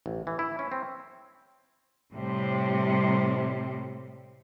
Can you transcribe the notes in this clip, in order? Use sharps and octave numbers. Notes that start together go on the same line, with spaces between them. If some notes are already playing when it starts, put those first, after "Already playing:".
A1
E3
E4
C#4
C4
A2 C3 G3